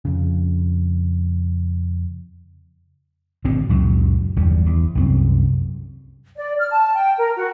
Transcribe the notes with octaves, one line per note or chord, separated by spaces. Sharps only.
F2 C#3
G#1 B2 D3 C4
C#2 F#2 A#2
G1 E2 G3
E2
C2 F#2 C4
D5
F6
A5
G5
A#4
F#4